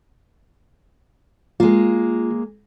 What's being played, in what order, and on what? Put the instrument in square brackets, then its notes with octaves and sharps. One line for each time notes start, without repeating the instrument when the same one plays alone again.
[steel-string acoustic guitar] G#3 A#3 [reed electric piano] F4